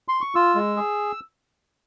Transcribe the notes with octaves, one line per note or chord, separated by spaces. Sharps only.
C6
C#6
F4 E6
G#3
G#4